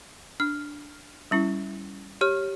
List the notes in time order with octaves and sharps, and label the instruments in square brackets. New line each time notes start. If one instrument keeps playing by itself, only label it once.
[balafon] D4 [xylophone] F6
[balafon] G3 C#4 E4
[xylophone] G4 C#5 F6